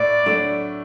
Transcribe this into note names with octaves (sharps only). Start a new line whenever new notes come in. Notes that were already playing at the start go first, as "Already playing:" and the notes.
Already playing: A2 D5
F#3 A3 D4